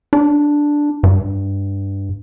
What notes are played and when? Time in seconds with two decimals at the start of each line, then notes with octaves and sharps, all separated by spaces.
0.13 D4
1.03 G2